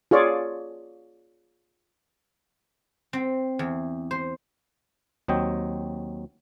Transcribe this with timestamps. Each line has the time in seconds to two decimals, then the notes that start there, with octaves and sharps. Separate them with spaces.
0.11 F4 G#4 C#5 D5
3.13 C4
3.59 E2
4.11 C5
5.28 D#2 F#3 C4 D#5 G5